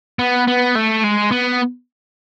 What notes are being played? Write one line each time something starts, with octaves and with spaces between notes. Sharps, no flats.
B3
B3
A3
G#3
B3